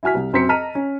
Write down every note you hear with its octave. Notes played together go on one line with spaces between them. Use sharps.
E4 F#4 G#5 F6 B6
C2
F#2 C4 A#5 B6 C#7
D#5 A5 A#5 F6 B6 D#7
C#4